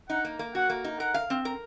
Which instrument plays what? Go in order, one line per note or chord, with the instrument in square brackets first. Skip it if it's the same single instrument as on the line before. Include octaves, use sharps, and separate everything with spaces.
[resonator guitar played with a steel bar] D#4 [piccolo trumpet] F#5
[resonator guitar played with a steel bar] A#3
A#3
[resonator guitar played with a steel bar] F#4 [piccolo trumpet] F#5
[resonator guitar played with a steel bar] A#3
D#4
[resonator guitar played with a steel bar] A#4 [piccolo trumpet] F#5
[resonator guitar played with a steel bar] F5
C4
A#4